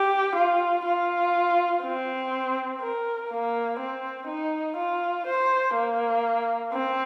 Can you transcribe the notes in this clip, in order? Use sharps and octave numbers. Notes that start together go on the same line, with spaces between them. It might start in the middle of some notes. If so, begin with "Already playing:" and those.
Already playing: G4
F4
F4
C4
A#4
A#3
C4
D#4
F4
C5
A#3
C4